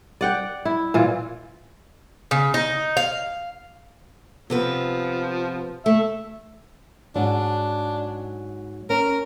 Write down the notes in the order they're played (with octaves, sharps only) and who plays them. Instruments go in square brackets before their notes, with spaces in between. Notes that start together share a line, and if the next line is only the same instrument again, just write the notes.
[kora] D5 F#5 G5
E4
A#2 E3 F4
[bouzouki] C#3
D#4
F5
[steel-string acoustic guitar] C3 B3 B4 [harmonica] F3
[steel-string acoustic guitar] A3 [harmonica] E5
[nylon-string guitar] G#2 F#3 [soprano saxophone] D4
[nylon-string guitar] C#4 [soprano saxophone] A#4